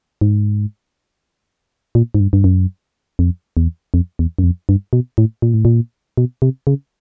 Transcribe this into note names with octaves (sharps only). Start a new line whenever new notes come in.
G#2
A#2
G#2
G2
G2
F#2
F2
E2
F2
E2
F#2
F2
G2
B2
A2
A#2
A2
A#2
B2
C3
C#3